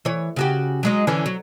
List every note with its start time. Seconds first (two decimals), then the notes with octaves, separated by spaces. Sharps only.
0.05 E3 C#5
0.36 C#3 F#4 G4
0.83 F#3 G#3 D#4
1.07 D3 E3 C#4
1.26 F#3